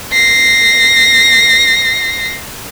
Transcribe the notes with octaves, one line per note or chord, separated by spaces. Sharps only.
A#6 C7